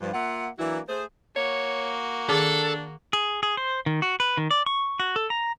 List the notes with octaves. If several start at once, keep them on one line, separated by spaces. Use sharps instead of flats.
G2 F3
A#3 F4 E5 F#5
E3 F#3 A#3 D4 E4 F#4
A3 G#4 C5
A#3 F#4 C#5
D#3 D4 G#4 A4 D6
G#4
G#4
C5
D#3
F#4
B4
D#3
D5
C#6
F#4
A4
A#5